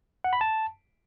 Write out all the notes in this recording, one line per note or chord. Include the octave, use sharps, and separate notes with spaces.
F#5
B5
A5